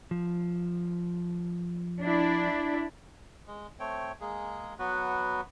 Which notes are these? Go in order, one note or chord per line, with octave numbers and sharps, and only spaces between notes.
F3
D4 E4
G#3
A3 C4 C#5 G5
G#3 A#3 G#4
F#3 B3 F#4 B4